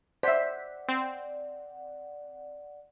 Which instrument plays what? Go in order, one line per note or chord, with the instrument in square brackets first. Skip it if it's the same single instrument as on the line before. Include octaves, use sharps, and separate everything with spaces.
[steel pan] C5 E5 [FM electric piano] D5 F#5 [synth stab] B6
[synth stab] C4